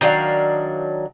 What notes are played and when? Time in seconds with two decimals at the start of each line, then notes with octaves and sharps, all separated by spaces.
0.01 D#3 F#3 D4 F5